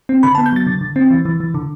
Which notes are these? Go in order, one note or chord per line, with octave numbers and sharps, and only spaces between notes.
C4
D3 B5
B3 A5
G6
F#3 A6
D3
D3
C4
E3
E3
E3
D3